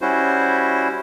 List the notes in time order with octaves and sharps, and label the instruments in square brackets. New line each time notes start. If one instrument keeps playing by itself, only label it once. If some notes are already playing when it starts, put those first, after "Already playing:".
[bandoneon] G3 C#4 E4 F#4 C5